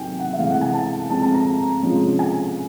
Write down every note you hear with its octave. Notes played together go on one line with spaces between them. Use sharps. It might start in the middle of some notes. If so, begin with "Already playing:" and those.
Already playing: C3 D#3 F#3 G5 G#5
F#5
E5
C3 E3 G#3 F5
F#5
G#5
A5
F3 G#3 C4 A5
A5
A#5
C3 F3 G#3 C#4 F4
G#5